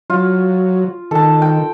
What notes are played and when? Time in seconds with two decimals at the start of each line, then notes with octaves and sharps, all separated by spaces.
0.10 F#3 F4
1.11 D#3 A4 A5
1.42 G5